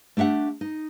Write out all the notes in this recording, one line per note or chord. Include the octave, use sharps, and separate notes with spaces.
A3 D4 G4 E5 F#5
D#4